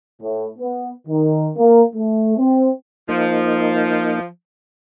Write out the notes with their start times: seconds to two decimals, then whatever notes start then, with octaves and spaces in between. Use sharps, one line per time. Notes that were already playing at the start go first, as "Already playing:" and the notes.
0.22 A2
0.59 B3
1.08 D#3
1.57 A#3
1.95 A3
2.37 C4
3.09 F3 A#3 D#4